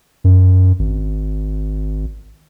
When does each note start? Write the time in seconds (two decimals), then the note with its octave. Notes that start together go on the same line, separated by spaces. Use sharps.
0.24 F#2
0.79 G#1